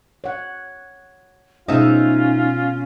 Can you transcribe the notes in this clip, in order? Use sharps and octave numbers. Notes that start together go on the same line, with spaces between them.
C#5 F#5
B2 G#3 C#4 D#4 F4 E5